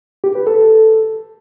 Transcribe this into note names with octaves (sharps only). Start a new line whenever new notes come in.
G4
B4
A4